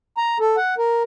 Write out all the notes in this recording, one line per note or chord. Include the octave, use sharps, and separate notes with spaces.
A#5
A4
F#5
A#4